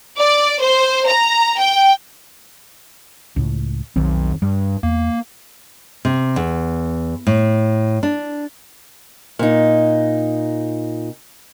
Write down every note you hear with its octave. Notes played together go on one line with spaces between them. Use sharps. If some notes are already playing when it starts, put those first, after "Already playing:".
D5
C5
A#5
G5
C#2 A2
F1 B1 D#3 C4
G2 G3
E2 A#3
C3
E2
A2
D4
A#2 D#4